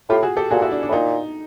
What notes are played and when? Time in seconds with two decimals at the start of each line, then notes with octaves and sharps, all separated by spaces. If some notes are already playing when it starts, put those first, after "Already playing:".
0.09 A2 F4 G4
0.23 F#4 G#4
0.37 G4 A4
0.51 A#2 F#4 G#4
0.62 E4 F#4
0.72 D4
0.83 D4
0.89 A2
0.93 A#2 D#4